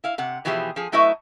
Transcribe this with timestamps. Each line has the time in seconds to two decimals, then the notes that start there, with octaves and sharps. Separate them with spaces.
0.04 E4 F5
0.18 C3 F#5
0.45 B2 E3 F3 G4 G#4 E5
0.76 F3 G#4
0.92 F#3 A3 E4 B4 D#5 E5